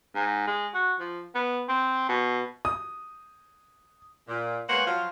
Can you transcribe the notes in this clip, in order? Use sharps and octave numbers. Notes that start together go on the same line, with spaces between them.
G#2
G#3
F#4
F3
B3
C4
B2
D#6
A#2
G#3 A#3 B3 C5 C#5 F#5
F3 F#3 F4